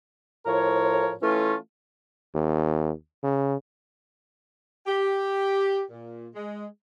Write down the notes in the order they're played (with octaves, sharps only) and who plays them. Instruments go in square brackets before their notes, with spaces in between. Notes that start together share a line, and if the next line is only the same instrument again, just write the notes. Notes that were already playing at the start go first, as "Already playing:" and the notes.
[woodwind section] A2 F3 A#4 C#5
E3 A3 C#4 F4
[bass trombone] D#2
C#3
[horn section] G4
A#2
G#3